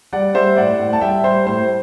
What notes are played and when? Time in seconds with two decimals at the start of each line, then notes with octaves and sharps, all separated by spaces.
0.13 G3 D5 F#5
0.35 G3 C5 E5
0.57 A2 D5 F#5
0.79 A2
0.93 A5
1.01 G3 E5 G5
1.24 G3 C5
1.46 A2 C5